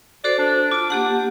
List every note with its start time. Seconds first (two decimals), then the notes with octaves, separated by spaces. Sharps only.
0.24 F#4 A4 C5 D5
0.38 D4
0.71 F4 A5 D6
0.90 A#3 D4 G4 F#5